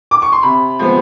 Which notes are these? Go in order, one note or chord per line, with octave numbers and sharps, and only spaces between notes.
D6
C#6
C6
C3 B5
F3 G#3 B3